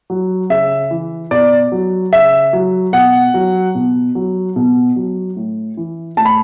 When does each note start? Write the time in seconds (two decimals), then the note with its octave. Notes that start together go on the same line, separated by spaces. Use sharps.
0.10 F#3
0.50 C#3 E5
0.91 E3
1.31 B2 D5
1.72 F#3
2.12 C#3 E5
2.53 F#3
2.93 B2 F#5
3.34 F#3
3.75 B2
4.15 F#3
4.56 B2
4.96 F#3
5.36 A2
5.77 E3
6.17 A2 A5
6.25 B5